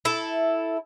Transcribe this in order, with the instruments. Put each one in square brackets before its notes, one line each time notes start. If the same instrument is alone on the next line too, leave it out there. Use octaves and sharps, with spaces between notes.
[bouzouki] E4 A4